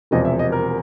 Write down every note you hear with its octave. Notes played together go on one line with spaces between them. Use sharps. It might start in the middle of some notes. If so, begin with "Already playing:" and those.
E1 E2 C3 F3 D#5
E5
D#5
A#4